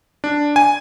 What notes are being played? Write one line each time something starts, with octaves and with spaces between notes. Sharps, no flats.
D4
G#5